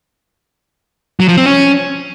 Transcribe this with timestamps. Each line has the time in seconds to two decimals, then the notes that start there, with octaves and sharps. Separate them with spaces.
1.20 F#3
1.28 F3
1.37 C4
1.46 C#4